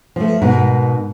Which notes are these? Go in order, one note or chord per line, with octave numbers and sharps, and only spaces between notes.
F3 A3
G#2 B2 A#4